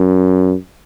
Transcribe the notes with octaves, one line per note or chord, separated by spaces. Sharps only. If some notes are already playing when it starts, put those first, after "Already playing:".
Already playing: F#2